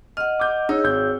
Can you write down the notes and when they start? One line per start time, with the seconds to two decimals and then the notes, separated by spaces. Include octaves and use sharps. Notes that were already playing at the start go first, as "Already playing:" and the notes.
0.17 D#5 F#5 F6
0.39 D6 G6
0.69 D#4 G#4 C#5 E6
0.84 G#1 G6